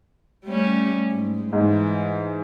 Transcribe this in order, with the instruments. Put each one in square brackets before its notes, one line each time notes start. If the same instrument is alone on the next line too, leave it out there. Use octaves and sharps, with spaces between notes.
[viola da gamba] G3 A3 C#4
G#2
[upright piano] G#2 [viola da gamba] E3